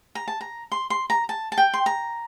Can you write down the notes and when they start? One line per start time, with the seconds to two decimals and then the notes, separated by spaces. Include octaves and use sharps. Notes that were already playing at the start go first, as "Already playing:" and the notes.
0.15 A#5
0.28 A5
0.41 A#5
0.72 C6
0.90 C6
1.10 A#5
1.29 A5
1.52 A5
1.58 G5
1.74 C6
1.86 A#5